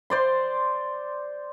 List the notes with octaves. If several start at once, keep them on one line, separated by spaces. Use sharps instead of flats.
C5 D5 C6